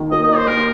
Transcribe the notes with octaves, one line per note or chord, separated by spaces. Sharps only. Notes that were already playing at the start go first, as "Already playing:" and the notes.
Already playing: D#2 D#3
A#3 D#5
D#5
D#4
C5
D#2 A#4